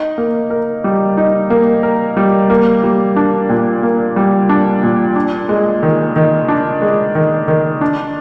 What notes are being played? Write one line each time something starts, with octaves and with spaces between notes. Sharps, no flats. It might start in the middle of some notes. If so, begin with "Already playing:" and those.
Already playing: D#4
A#3
A#4
G3
D#4
A#3
A#4
G3
A#3
G3
D4
A#2
A#3
G3
D4
A#2
D4
G#3
D#3
D#3
D4
G#3
D#3
D#3
D4